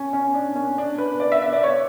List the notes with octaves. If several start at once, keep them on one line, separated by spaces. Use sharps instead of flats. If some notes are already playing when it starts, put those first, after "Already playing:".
Already playing: C#4
C#4
D4
C#4
D4
B4
D5
E5
E5
D5
C#5